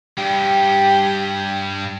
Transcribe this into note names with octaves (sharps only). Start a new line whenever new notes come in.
G2 G4